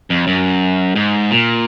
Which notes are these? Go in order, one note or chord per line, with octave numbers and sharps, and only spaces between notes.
F2
F#2
G#2
A#2